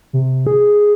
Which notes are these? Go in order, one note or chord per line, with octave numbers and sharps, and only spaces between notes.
C3
G#4